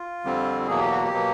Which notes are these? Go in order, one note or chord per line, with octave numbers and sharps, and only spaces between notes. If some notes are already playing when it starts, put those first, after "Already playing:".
Already playing: F4
F2 D3 G3 C4
E2 B2 F#3 A#3 G#4
G4
F#4
G4
B2 F#3 A#3